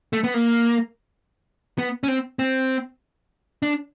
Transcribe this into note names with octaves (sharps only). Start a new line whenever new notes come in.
A3
B3
A#3
B3
C#4
C4
C4
D4